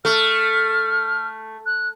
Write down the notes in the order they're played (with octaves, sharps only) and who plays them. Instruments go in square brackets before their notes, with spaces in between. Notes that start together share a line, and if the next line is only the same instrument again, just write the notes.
[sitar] A3 [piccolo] F6
[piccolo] F#6